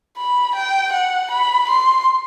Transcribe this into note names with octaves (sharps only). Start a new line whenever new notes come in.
B5
G5
F#5
B5
C6